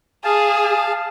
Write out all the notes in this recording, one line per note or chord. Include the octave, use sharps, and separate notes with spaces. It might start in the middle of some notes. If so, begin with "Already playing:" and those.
G#4 F5 A5